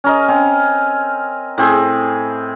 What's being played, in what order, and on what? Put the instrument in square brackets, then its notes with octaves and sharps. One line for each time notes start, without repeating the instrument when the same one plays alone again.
[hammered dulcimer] C#4 A#4 D#5
C4 C#4
A2 C4 G#4